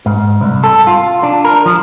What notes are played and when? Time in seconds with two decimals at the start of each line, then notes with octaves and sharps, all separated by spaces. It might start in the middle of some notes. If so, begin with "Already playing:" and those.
0.06 G#2
0.41 C2
0.64 A4
0.87 F4
1.23 D4
1.45 A#4
1.66 F3